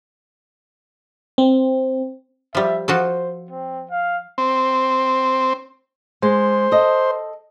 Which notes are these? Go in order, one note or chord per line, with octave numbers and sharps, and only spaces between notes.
C4
F3 G3 E5
F3 F#4 A4 C5
C4
F5
C4
G#3 C5
A4 D#5